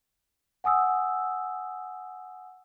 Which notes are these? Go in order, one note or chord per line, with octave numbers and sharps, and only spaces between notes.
F#5 G#5 D#6 E6